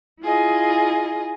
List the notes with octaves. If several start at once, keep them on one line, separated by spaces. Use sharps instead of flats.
E4 F4 G#4 D#5